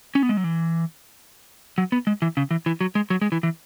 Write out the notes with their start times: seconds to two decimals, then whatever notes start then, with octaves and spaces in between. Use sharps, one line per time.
0.15 C#4
0.23 B3
0.29 G#3
0.37 F#3
0.44 E3
1.78 F#3
1.92 B3
2.07 G#3
2.22 E3
2.37 C#3
2.51 E3
2.66 E3
2.81 F#3
2.95 G#3
3.10 F#3
3.21 G#3
3.32 E3
3.43 E3